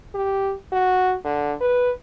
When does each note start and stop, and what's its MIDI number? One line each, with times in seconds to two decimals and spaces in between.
0.15 0.52 67
0.72 1.15 66
1.25 1.53 50
1.60 1.91 71